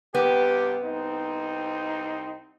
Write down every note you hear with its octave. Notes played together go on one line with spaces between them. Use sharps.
G2 C3 B3 G4
C2 C4 D#4